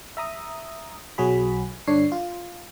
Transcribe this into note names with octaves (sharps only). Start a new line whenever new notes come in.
E5 A#5 D#6
B1 F#3 F#4 G#4 B5
G2 D3 D4 C#5 C7
F4